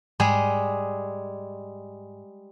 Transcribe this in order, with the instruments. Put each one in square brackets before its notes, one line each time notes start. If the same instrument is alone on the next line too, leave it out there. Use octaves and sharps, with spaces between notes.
[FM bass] G#2 [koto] G3 G#3 G#4